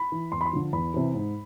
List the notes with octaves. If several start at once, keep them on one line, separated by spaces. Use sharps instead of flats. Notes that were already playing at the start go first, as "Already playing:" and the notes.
Already playing: B5
E3
E2 C6
B5
C6
D3 F3
E2 B5
C3 E3
G#2